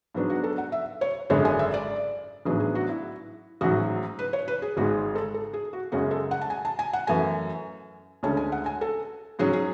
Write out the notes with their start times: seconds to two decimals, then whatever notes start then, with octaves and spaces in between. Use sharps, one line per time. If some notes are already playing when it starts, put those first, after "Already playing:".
0.14 G#2 F#3 B3 D4
0.30 F#4
0.44 A4
0.58 F#5
0.72 E5
1.01 C#5
1.30 G#1 F#2 D3 G#3 D4 C#5
1.45 G#5
1.59 E5
1.74 D5
2.45 A1 G#2 F#3 B3 D4 G#4
2.60 G#4
2.75 F#4
2.89 E4
3.61 A1 G#2 F#3 F#4
4.19 B4
4.33 C#5
4.48 B4
4.62 G#4
4.77 G#1 G#2 G#3 F#4
5.15 A4
5.34 A4
5.53 G#4
5.73 F#4
5.92 F#2 C#3 G#3 C#4 F#4
6.11 A4
6.31 F#5
6.41 A5
6.50 G#5
6.65 A5
6.79 G#5
6.93 F#5
7.07 F#2 E3 A3 G#5
8.23 D2 D3 G#3 C#4 A5
8.37 G#5
8.52 F#5
8.66 G#5
8.81 A4
9.39 G#2 F#3 C#4 G#4
9.53 G#4